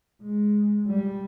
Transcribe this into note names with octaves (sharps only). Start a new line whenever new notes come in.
G#3
G3